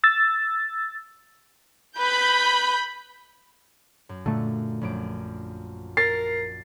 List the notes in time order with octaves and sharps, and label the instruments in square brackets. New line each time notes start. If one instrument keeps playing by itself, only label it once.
[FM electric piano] E6 A6
[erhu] B4 [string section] B5 G6
[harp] F#2
[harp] A#2 C#7 [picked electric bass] D3 A3
[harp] A#1 F#2 D7
[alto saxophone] A#4 [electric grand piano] A6 C7